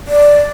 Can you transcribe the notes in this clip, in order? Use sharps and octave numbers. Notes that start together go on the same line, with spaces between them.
D5